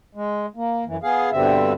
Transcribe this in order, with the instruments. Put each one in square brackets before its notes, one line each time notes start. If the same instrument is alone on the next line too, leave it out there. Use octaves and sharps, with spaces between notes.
[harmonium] G#3
A#3
F#2 E3
B3 G#4 F5
G2 B2 D3 G3 C4 E5